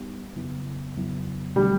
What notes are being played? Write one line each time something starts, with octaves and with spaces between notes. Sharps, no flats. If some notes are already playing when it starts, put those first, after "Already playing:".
Already playing: G3 B3 D#4 G4
F2 C#3 F#3 B3 E4
F2 C#3 F#3 B3 E4
D3 F#3 G3 A3 C4